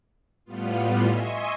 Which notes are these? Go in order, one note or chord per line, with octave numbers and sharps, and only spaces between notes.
A2 G3 B3 F4
D#5 E5 G#5 C6 C#6